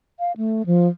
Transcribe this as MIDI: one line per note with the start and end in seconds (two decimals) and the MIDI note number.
0.19 0.32 77
0.37 0.66 57
0.66 0.88 53